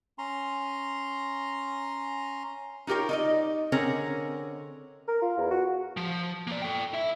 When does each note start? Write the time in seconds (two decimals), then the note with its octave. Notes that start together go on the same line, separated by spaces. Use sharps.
0.18 C#4 A#5 C6
2.87 D#4 F4 G4 A#4 C#5
3.09 D#4 D5 D#5
3.72 D3 C4 C#4 G#4 A#4 C#5
5.08 A#4
5.22 F4
5.38 E2
5.51 F#4
5.97 F3
6.47 A#3 D5
6.62 A4 G5
6.94 E4 E5